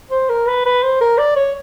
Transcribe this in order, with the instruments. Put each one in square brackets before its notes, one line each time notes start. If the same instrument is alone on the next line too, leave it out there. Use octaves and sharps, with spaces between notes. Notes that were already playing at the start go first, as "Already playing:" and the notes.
[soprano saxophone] C5
A#4
B4
B4
C5
A#4
D5
C#5